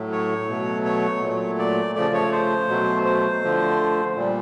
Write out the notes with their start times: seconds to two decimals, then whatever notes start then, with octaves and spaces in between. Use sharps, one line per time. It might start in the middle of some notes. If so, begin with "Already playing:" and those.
Already playing: A2 F#3 A3
0.12 C#5
0.48 B2 F#3 A3
0.85 C#5
1.22 A#2 F#3 A3
1.59 D5
1.96 C#3 F3 A3 D5
2.14 C#5
2.32 C5
2.69 B2 F#3 A3
3.05 C5
3.42 D3 F3 A3
4.16 A#2 G3